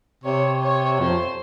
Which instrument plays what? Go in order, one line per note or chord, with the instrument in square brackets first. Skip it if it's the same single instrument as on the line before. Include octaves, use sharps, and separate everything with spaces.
[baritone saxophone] C3 [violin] C#5
[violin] C#5
[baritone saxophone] F2 [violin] C5